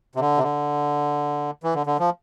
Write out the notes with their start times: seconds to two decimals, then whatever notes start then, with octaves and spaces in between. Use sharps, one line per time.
0.15 C3
0.20 D3
0.38 C3
0.43 D3
1.63 E3
1.75 D3
1.87 D3
1.99 F3